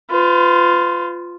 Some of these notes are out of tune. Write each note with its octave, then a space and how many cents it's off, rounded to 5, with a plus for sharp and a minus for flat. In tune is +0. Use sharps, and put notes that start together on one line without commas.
F4 +0 B4 +40